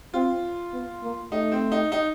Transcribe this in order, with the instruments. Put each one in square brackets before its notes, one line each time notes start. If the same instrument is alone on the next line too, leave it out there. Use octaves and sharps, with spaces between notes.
[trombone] C4 [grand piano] F4
[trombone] B3
A#3
[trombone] A3 [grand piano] D#4
[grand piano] C4
D#4
D#4